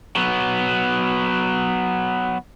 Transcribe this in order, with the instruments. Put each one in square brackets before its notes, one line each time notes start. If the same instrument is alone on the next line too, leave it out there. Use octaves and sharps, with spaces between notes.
[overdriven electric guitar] F#3 B3